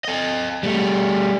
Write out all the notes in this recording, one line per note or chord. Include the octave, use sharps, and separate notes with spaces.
A4 D#5
G3 A3